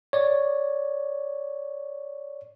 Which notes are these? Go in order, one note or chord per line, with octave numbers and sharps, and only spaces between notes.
C#5 D5